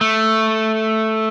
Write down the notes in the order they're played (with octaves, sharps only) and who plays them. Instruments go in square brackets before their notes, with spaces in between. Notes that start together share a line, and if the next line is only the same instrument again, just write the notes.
[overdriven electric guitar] A3